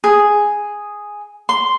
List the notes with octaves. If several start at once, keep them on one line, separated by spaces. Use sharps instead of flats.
G#4
C6